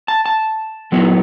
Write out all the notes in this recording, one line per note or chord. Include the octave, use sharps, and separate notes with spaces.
A5
A5
A#2 F#3 B3 E4